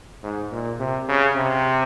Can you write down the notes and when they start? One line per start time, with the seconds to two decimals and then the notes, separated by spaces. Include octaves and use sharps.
0.24 G#2
0.51 A#2
0.80 C3
1.09 C#3
1.36 C3